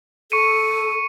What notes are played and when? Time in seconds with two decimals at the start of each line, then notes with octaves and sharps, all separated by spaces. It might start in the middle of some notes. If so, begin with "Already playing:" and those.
0.32 A4 C#6 C#7 D#7